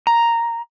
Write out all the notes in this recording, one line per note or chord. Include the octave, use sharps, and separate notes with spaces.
A#5